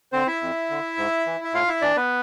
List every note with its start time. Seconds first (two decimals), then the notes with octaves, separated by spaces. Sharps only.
0.12 D3 C4 C5
0.27 E4 E5
0.41 F2
0.70 D3
0.98 G#2
1.26 E3
1.45 E5
1.53 A2 F4 F5
1.68 E4 E5
1.82 E3 D4 D5
1.97 B3 B4